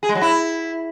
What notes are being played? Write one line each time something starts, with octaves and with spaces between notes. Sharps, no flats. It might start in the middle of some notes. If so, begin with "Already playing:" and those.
G#4
G#3
F#3
E4